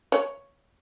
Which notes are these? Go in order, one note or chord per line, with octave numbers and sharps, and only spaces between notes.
C#5